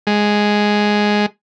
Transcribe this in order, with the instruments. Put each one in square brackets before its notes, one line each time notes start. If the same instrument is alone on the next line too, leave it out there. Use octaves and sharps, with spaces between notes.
[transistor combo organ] G#3